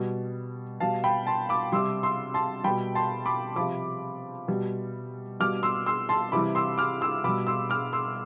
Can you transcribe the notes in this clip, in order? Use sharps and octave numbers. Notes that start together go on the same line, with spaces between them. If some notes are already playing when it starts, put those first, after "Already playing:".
Already playing: B2 G3
B2 G3 F5 A5
G5 B5
A5 C6
B5 D6
C3 G3 C6 E6
C6 E6
A5 C6
B2 G3 G5 B5
A5 C6
B5 D6
C3 F3 B5 D6
B2 G3
B2 G3 D6 F6
C6 E6
C6 E6
A5 C6
C3 E3 G3 B5 D6
C6 E6
D6 F6
C6 E6
B2 G3 B5 D6
C6 E6
D6 F6
C6 E6